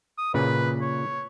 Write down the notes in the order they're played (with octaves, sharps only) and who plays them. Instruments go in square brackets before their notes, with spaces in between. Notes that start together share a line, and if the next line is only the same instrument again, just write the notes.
[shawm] D#6
[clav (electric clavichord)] A#2 C#3 [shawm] B4
[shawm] C#5